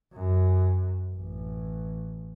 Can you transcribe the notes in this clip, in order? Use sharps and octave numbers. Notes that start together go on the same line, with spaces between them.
F#2
A1